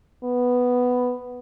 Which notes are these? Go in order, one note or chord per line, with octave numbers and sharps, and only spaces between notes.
B3